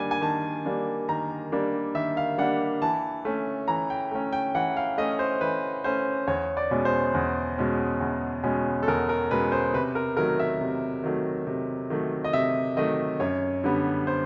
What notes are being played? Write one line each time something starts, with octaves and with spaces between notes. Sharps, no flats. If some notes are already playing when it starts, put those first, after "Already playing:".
Already playing: D#3 G3 A#3 D4 G#5
G#5
D#3 A5
G3 A#3 D4
D#3 A#5
G3 A#3 D4
D#3 E5
F5
G3 A#3 D4 F#5
E3 A5
A3 C#4
E3 A#5
G5
A3 C#4
G5
E3 F#5
F5
A3 C#4 D#5
C5
E3 B4
A3 C#4 C5
E2 C#5
D5
B2 G#3 C#4
C5
E2
B2 G#3 C#4
E2
B2 G#3 C#4
A4
E2 A#4
A#4
B2 G#3 C#4 B4
C5
C3 B4
A#4
D#3 F#3 A3 A#4
E5
C3
D#3 F#3 A3
C3
D#3 F#3 A3
D#5
C3 E5
D#3 F#3 A3 D#5
F#2 C#5
D3 G3 B3
C5